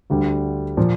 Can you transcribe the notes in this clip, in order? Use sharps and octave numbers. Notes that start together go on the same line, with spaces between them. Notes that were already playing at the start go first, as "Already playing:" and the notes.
D2 D3 G3
A#2 F3 A#3